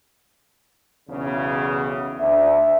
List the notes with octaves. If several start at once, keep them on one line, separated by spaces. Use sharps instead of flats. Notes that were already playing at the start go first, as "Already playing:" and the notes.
B1 E2 C#3
D2 E5